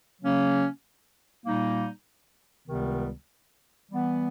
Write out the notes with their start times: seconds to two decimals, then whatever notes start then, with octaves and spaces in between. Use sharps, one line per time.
0.22 C#3 F#3 A#3 C#4
1.45 A#2 G3 A#3 D#4
2.68 C#2 C3 D#3 G3 B3
3.90 E3 G3 B3